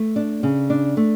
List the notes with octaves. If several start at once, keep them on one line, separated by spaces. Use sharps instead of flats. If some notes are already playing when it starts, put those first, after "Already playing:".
Already playing: A3
D4
C#3
D4
A3